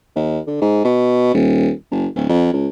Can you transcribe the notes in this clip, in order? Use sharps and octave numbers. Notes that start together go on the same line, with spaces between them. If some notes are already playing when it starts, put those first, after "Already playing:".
D#2
D3
G#2
B2
D#1
F#1
D1
F2
C#2